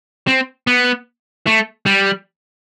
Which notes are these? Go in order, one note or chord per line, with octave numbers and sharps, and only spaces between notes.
C4
B3
A3
G3